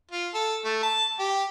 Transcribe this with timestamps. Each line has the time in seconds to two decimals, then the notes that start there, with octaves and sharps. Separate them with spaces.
0.11 F4
0.34 A4
0.65 A3
0.83 A5
1.19 G4